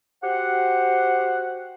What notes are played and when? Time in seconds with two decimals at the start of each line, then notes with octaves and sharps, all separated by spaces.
0.23 F#4 G4 C5 F#5